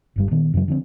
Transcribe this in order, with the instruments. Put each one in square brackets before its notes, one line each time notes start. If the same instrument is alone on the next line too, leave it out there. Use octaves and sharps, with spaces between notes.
[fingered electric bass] G1 G2 G3
A#2 D#3 B3
F#2 C#3 E3 F#3
D3 F3 G#3 C4